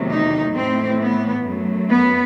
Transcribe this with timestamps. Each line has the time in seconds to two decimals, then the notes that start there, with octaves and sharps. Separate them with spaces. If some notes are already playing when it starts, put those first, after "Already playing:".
Already playing: E2 C3 D#3 F#3 A3
0.10 D#4
0.55 A2 E3 A3 C4
1.00 B3
1.45 F#2 F#3 A3
1.90 B3